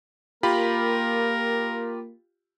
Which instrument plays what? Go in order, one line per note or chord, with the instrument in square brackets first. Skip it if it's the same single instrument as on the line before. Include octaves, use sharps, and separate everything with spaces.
[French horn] A#3 [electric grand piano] F4 G4 B5 [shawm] A#4